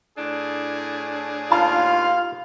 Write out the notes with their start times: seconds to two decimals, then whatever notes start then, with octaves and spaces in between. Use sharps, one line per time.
0.18 A2 D4 G#4
1.52 D#2 F4 F5 A5